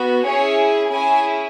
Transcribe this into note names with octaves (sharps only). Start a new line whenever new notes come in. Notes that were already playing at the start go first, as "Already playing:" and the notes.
Already playing: B3 F#4
C#4 E4 G#4 C#5
C#4 E4 G#4 G#5